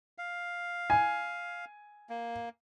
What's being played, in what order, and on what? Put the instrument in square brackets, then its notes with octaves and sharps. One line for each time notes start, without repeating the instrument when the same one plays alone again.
[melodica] F5
[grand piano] G#5
[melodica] A#3